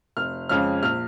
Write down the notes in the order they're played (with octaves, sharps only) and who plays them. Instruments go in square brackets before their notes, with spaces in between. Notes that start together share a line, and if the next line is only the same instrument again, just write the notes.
[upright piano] F1 F6
F2 C#3 G#3 C#4 F6
A#1 F6